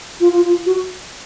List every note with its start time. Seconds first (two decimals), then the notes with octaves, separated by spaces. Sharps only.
0.20 F4
0.32 F4
0.45 F4
0.66 F#4